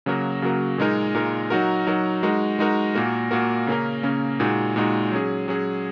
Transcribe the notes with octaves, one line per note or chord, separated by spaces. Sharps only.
C#3 F#3 A#3 F#4 A#4
C#3 F#3 A#3 F#4 A#4
A#2 G#3 D#4 A#4
A#2 G#3 D#4 A#4
F#3 D#4 F#4 A#4
F#3 D#4 F#4 A#4
G#3 D#4 F#4 A#4
G#3 D#4 F#4 A#4
A#2 A#3 F#4 A#4
A#2 A#3 F#4 A#4
C#3 A#3 C#4 A#4
C#3 A#3 C#4 A#4
A#2 G#3 D#4 F#4
A#2 G#3 D#4 F#4
F#3 C#4 G#4
F#3 C#4 G#4